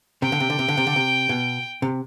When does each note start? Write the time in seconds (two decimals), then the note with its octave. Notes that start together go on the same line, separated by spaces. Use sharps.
0.22 C3 G5
0.32 D3
0.40 C3
0.50 D3
0.59 C3
0.69 D3
0.77 C3
0.87 D3
0.96 C3
1.29 B2
1.82 C3